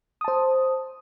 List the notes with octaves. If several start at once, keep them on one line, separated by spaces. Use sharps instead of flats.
C5 A5 D#6